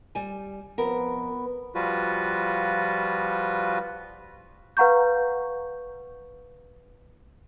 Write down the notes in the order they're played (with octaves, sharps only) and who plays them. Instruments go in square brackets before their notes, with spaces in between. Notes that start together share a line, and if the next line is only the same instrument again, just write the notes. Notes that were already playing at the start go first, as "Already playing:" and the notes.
[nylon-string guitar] G3 G#5
[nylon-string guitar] F2 A#4 [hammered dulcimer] B3
[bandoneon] F3 G3 F4 F#4 B4
[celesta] B4 F5 F#5 A#5 C#6 G6